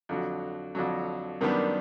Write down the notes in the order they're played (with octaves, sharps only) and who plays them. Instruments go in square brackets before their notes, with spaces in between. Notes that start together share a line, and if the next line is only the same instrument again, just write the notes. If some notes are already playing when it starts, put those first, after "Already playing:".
[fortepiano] F2 D3 F#3
F2 D3 F#3
F#2 D#3 G3 B3 D4